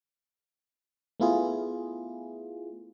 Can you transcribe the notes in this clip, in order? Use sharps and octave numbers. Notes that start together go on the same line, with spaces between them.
A3 B3 E4 F4 G#4